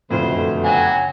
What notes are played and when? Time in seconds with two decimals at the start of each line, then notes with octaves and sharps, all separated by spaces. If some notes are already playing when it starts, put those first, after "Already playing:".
0.11 F#1 F2 B2 D3 A3 C5
0.64 F#3 F#4 G4 G#5